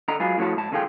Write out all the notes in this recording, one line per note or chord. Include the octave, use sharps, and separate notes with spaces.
D3 D#5 A#5
F#3 G#3 F4 G#4 B4
A2 F3 F#4 C#5 A5
G#2 A5
C2 D3 D#3 F4 G#4 G5